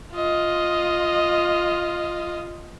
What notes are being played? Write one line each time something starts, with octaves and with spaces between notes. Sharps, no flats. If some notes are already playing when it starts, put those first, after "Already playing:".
F4 D#5